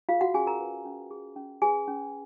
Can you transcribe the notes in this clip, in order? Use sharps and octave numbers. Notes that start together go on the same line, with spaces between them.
F4 G#4 F5
F#4 F#5
C#4 G#4 G#5
A#4 A#5
B4
C#4
G#4
C#4
G#4 B4 G#5
C#4